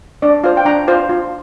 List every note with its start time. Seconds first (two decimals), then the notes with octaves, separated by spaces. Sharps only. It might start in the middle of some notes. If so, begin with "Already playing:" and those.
0.22 D4 D5
0.44 F4 C5 F5
0.57 G5
0.65 D4 A#5
0.88 F4 C5 F5
1.09 F4